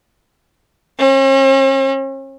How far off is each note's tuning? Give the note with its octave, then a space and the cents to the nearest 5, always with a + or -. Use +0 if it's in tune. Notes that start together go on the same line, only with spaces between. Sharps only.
C#4 -45